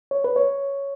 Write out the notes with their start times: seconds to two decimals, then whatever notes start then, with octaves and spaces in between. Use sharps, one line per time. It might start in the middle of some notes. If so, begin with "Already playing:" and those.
0.11 C#5
0.24 B4
0.36 C#5